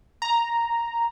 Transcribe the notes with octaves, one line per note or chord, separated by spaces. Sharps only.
A#5